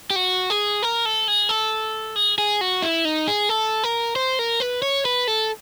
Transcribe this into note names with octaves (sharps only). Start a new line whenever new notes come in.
G4
F#4
G#4
A#4
A4
G#4
A4
G#4
G#4
F#4
E4
D#4
G#4
A4
A#4
C5
A#4
B4
C#5
B4
A4